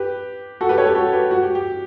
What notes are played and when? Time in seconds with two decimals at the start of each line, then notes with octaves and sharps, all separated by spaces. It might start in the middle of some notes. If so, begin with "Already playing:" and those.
Already playing: G4 B4
0.61 F#4 A4
0.69 G4 B4
0.78 A4 C#5
0.86 G4 B4
0.95 F#4 A4
1.13 G4 B4
1.31 F#4
1.43 G4
1.55 G4